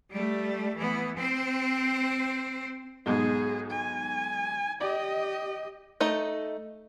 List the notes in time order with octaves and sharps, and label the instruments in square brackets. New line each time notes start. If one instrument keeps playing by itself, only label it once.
[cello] G3 A3
E3 B3
C4 C5
[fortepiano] B1 G#2 B2 [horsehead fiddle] G#4
[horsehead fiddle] G#5
[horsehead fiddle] G4 D#5 [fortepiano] D5
[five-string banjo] A3 D#4 D#5